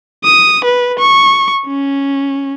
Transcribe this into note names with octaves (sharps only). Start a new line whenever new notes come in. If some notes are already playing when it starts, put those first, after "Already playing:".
D#6
B4
C#6
C#4